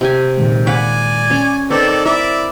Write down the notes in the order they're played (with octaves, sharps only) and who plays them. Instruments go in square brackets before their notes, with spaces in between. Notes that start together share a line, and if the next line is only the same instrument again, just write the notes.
[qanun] C3 G4 G#5
[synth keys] A#2 D#3 G#3
[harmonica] D5 G#5 [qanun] F5 F#5 B5
[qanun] C#4 C#5
[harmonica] D#3 A4 D5 [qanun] C4 [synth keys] B4 C5
[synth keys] E4 B5 [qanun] A#4 [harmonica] D5 E5